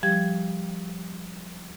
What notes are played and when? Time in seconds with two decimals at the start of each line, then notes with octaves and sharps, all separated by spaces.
0.03 F3 G3 G4 G#6